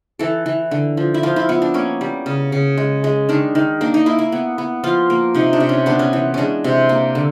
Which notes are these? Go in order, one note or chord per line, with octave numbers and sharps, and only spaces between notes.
E3 A4
E3
D3
F3
E4
F3 F4
E4
B3 E4
D4
A#3 C#4
G3
C#3
C#3
G#3
G#3
D#3 D4
D#3
A#3 D4
D#4
A#3 E4
E4
B3
B3
F3 F4
A#3
C3 D#4
D4
C3
C#4
B3 D4
C#4
E3
G#3 C#4 D4
C3
A#3
D3